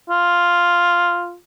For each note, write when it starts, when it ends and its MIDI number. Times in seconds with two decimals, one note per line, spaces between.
0.09 1.36 65